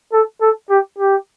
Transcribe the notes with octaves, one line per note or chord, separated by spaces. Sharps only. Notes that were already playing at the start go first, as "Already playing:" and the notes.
A4
A4
G4
G4